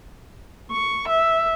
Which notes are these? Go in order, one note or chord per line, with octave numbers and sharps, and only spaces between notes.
C#6
E5